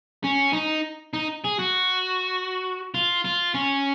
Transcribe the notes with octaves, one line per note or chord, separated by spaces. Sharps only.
C#4
D#4
D#4
G#4
F#4
F4
F4
C#4